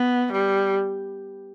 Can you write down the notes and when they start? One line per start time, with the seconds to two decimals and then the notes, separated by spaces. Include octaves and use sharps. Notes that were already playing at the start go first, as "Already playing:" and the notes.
Already playing: B3
0.33 G3